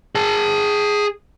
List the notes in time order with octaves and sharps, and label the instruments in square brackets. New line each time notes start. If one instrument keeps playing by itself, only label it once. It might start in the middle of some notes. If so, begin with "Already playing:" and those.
[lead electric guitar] G#4 A5